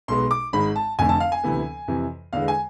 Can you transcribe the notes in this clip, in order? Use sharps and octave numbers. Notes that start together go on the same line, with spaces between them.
B1 B2 G#3 B3 C6
D6
G#1 G#2 G#3 B5
A5
F1 F2 D3 A3 G#5
A5
F5
G#5
D2 C3 E3 B3
F2 C3 E3
E2 D3 G#3 B3 F5
G#5